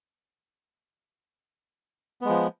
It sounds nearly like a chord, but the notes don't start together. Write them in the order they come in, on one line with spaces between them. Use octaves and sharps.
B3 G#3 F3